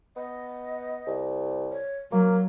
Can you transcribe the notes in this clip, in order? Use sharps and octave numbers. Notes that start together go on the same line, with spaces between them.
B3 D#5
C2
C#5
F#3 A#3 A#4